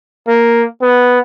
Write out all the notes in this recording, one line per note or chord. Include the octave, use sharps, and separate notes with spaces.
A#3
B3